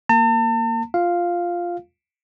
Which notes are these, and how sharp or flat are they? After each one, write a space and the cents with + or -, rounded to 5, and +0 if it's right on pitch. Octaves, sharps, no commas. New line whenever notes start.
A#3 +0 A5 +40
F4 +0 F5 +0